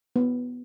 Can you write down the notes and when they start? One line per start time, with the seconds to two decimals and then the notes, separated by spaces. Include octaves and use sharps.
0.16 B3